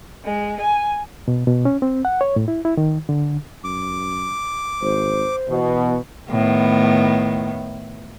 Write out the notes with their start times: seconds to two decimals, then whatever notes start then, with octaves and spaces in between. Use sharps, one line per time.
0.25 G#3
0.61 G#5
1.28 B2
1.47 B2
1.65 C#4
1.82 C4
2.05 F#5
2.21 C#5
2.36 A2
2.48 E4
2.65 E4
2.77 D#3
3.09 D3
3.64 F#2 D6
4.82 G#1 C5
5.49 B2 E3
6.30 A2 D#3 B3